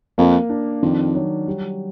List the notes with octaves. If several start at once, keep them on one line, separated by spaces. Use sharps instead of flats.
F2 A#3
D4
F2 D#3
F#3
G3